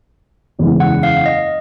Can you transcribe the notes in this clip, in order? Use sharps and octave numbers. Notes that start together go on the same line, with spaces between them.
F#1 E2 C#3 E3 G#3
F#5
F5
D#5